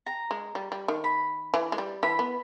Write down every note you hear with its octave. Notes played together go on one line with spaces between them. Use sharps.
A#5
G#3
G3
G3
D#3
B5
E3
G#3
G3
E3 B5
B3